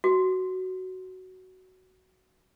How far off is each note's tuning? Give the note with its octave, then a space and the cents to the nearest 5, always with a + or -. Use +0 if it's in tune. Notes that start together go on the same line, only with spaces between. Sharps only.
F#4 +10